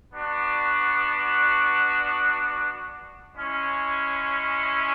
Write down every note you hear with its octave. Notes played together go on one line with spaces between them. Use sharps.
B3 D4 F#4
G#3 C#4 E4